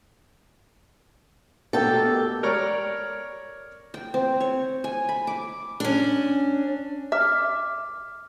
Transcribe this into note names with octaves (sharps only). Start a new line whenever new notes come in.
B2 A3 A#3 G4 A4
A#4 C#5 D5
G5
C4
C#5
G#5
B5
D6
C#4 D4
E5 D6 F6